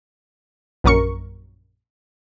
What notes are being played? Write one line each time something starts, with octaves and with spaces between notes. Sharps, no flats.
A#1 F#2 A#4 C#6 C#7